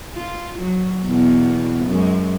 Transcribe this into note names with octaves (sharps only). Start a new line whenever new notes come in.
F4
F#3
E2 B2
F#2 G#3